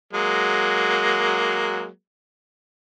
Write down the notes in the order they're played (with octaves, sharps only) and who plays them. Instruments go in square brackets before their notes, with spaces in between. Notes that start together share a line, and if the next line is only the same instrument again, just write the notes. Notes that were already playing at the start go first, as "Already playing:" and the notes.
[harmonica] F#3 G#3 A#3